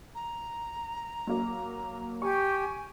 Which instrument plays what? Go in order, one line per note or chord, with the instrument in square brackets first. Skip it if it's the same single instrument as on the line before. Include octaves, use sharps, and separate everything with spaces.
[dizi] A#5
[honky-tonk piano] F#3 A#3
[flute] G4 [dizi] G#5 [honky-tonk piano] C#6